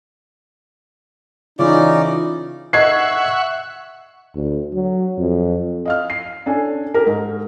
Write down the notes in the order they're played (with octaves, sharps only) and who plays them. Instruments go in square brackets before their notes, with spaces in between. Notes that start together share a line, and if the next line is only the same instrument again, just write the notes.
[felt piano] C#3 E3 [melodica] C#4 D5 [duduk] D#4 [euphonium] F4
[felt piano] D#5 G#6 C7 [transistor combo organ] E5 F#5 C#6
[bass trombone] D2
F#3
F2
[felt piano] D#5 F5 F6
C7
C#4 D4 A4 G#5
G4 A#4
G#2